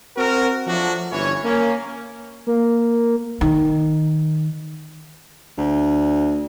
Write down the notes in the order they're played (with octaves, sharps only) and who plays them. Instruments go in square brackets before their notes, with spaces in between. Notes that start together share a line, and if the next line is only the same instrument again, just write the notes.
[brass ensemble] C4 F#4 A#4
F3 F#3 A3 D4 F#4
G1 E3 C#4 C#5
A#3 C#4
[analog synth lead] A#3
[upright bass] D#3
[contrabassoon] D2